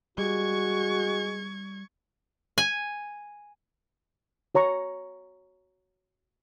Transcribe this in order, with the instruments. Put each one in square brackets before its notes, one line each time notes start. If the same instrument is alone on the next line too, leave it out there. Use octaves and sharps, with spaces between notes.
[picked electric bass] G3 [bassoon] G#3 [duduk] F#4 [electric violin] C#6 G#6
[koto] G#5
[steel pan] F#4 C#5 A#5 C#6